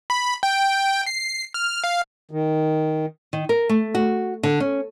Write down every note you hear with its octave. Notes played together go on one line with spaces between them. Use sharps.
B5
G5
C7
F6
F5
D#3
D#3
A#4
A3
F#4
D3
C#4